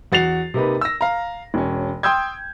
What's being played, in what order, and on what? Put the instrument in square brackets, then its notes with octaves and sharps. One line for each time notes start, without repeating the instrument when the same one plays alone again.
[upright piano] E2 F#4 A6 C7 F7
C3 A#3 D#4 B4
E6 A#6
F5 A#5
E1 C#4
G5 C6 D#6 E6 G6 G#6